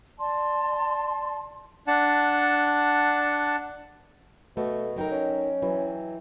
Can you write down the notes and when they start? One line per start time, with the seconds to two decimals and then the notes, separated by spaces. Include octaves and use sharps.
0.18 D5 A5 C6
1.87 D4 F#5 A5
4.57 B2 A3
4.96 F#3 D#4 A#4 D#5 G5
5.12 C#4
5.62 E3 F#3